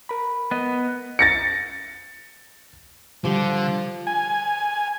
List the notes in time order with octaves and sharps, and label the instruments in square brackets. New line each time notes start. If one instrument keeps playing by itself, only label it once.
[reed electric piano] A#4 B5
[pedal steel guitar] B3 D#5
[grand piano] A6 A#6 C#7
[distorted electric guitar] D3 [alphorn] F3 [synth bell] G3 G4
[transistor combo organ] G#5